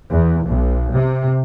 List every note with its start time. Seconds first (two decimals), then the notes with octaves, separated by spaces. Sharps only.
0.10 E2
0.47 B1
0.93 C3